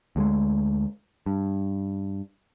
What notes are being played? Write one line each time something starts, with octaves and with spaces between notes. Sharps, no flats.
D2 G3 G#3
G2